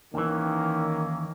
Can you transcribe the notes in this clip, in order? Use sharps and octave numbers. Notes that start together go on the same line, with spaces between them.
D#2 D#3 E3 A#3 C#4